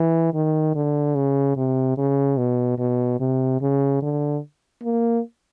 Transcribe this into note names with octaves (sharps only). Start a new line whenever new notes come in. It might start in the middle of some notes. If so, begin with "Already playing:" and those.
Already playing: E3
D#3
D3
C#3
C3
C#3
B2
B2
C3
C#3
D3
A#3